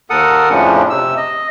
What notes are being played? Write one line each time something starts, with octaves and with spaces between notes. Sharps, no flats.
D#2 A4 A#4 F#5 D#6
F2 A2 C#3 F3 C#4 D4
C3 E6
D#5